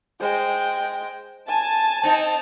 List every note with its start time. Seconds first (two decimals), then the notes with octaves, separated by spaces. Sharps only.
0.21 G#3 C5 G5
1.49 G#5 A5
2.03 C4 D#4